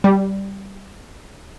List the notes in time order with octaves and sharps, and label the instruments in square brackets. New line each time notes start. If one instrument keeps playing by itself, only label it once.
[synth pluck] G3